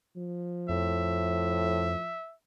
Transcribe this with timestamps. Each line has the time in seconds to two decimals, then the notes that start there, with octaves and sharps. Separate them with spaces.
0.16 F3
0.69 F2 A2 E5